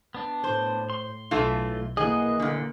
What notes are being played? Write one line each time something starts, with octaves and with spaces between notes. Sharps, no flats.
B3 D4
A2 C5
C6
B1 E3 A3 F4
E3 A#3 G#4 D#5 F#5
A#2 D3